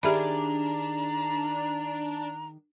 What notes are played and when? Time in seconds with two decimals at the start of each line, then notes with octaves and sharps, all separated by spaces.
0.03 D#3 D4 G4 G#4 D5 E5 A#5 B5